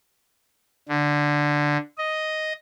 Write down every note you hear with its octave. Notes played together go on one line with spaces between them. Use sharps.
D3
D#5